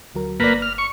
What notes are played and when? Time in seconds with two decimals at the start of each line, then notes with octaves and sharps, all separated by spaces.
0.15 D2 F#3 A#4
0.40 G1 A#3 B4 D5
0.62 F6
0.78 C#6